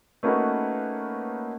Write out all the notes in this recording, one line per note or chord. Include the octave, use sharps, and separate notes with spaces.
A3 A#3 C#4 D#4 F#4 B4